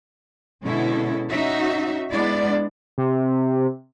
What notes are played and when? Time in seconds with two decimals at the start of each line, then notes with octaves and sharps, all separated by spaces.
0.63 B2 D3 G#3 C#4 E4 A4
1.30 C#4 D#4 F#4 E5
2.12 G#3 B3 D4 E4 D5
2.98 C3